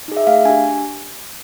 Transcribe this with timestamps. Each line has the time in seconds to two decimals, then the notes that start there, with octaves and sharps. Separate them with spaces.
0.08 D#4 G#4
0.17 E5
0.27 A3 F5
0.45 D4 G4 G#5